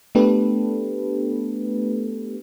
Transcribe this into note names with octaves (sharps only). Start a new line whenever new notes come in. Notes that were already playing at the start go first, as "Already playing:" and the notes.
A3 B3 D4 G4 A4 B4